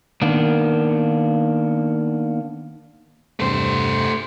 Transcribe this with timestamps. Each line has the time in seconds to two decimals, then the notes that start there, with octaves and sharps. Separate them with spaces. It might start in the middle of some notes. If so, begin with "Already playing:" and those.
0.22 D#3 A#3 B3 D4
3.40 E2 G2 C3 A3 C5